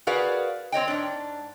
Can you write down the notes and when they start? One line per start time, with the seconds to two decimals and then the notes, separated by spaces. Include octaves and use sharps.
0.07 F#4 G#4 A#4 B4 D5 F5
0.72 C4 C#5 D#5 G5
0.88 G#2 D4